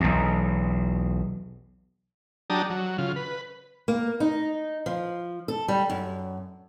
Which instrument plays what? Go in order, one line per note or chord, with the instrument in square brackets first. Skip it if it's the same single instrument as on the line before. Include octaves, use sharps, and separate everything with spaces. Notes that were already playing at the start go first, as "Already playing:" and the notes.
[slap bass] B1 E2
[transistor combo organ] F#3 D4 G4 A5 A#5 D#6
F#3
C#3 F4
B4
[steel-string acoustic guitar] A#3
D#4
F3
A4
G3
F#2